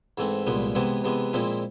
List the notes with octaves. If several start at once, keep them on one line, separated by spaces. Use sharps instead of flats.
G#2 E3 A3 C4
C2 A#2 F3 G#3 B3
C3 E3 G#3 B3 E4
C3 E3 G#3 B3
A#2 F3 G#3 C4 E4